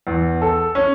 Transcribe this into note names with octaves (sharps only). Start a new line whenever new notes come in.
E2
A4
C#4